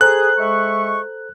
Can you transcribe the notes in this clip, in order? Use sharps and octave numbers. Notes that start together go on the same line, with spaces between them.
G#4 A4 C5 A#5 F#6
G#3 E5 C#6